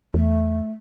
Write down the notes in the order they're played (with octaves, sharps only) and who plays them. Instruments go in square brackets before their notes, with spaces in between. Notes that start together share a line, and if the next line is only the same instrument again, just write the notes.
[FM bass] E2 [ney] A3